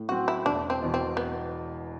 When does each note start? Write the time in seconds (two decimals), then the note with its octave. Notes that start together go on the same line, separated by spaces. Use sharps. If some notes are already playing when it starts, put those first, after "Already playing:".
Already playing: A2
0.09 F#3 C4 F#4
0.28 E4
0.45 E1 D4
0.70 C4
0.81 E2 B2
0.94 C4
1.17 B3